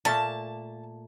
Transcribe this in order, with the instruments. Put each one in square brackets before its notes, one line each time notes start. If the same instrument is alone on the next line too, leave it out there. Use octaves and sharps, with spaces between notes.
[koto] A#2 A3 A#3 [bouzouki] A5